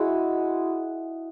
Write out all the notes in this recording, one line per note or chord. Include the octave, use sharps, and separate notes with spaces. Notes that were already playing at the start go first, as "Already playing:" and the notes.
Already playing: G#3 E4 F#4